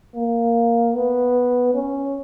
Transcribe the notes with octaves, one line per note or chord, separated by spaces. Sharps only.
A#3
B3
C#4